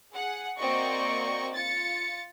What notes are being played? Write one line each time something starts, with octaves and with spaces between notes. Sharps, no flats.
G#4 F#5
A#3 C4 F#4 D5 D#5 C#6
F4 A6 C#7